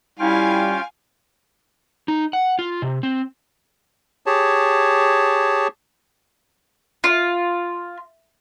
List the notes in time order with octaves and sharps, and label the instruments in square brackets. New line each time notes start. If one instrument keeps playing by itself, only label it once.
[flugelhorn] G3 [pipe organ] C#4 F4 G5 [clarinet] E4 [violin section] F5 G#5
[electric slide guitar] D#4
F#5
F4
C3
C4
[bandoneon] G4 G#4 C#5 A5
[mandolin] F4